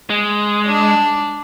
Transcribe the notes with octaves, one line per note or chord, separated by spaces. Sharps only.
G#3
D4